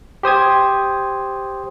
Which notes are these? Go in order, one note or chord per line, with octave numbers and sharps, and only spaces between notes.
G4 C5 D#6 G#6